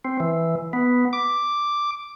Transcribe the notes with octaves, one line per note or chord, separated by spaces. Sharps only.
C4
E3
B3
D6